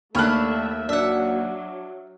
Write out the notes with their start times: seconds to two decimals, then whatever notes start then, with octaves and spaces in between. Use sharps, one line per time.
0.15 D#2 A3 D4 C#5 E5 B5 F6 F#6
0.89 F#3 D4 E5 F#5